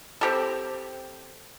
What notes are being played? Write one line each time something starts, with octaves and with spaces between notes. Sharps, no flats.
C4 G4 A4